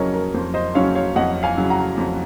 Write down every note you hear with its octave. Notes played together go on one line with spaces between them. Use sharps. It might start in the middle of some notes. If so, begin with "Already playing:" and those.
Already playing: F2 C#3 F#3 C#4 A#4 C#5 D#5
A#4
F2 C5
C5 D#5
C#3 F#3 C#4 C#5 F5
C#5 F5
F2 D#5 F#5
F5 G#5
C#3 F#3 C#4
F#5 A#5
F2